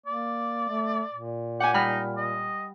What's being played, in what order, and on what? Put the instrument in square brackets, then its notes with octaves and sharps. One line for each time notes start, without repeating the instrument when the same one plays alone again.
[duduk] A#3 [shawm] D5
[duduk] A3
A#2
[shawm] G4 [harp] F#5 G#5
[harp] G3 B5 F6 [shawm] D#4
[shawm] D#5